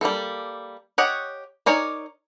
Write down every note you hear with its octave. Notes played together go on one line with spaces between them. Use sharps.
G3 A#3 C4 A4
G4 C#5 D#5 F#5
D#4 A#4 C#5 D5 G#5